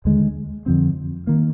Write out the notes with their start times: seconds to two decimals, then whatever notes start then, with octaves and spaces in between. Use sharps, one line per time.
0.05 D#2 D3 G#3
0.66 F2 D3 F3 C4
1.27 D#3 A#3